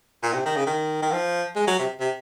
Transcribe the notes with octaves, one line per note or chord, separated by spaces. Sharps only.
A#2
C3
D#3
C#3
D#3
D#3
F3
G#3
F#3
C3
C3